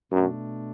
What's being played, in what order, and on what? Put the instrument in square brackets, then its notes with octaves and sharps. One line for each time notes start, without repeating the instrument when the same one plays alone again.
[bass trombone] F#2 [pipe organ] B2 A3 D4